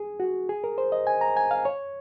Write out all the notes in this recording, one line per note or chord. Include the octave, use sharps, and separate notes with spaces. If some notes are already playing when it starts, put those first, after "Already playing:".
Already playing: G#4
F#4
G#4
A#4
C5
D#5
G#5
A#5
G#5
F5
C#5